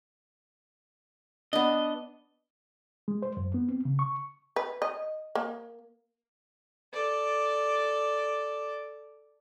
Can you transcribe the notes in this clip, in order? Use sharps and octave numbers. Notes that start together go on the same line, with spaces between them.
B3 D4 D#5
G#3
C5
F#2
B3
C4
C#3
C#6
B4
D#5
A#3
A4 D5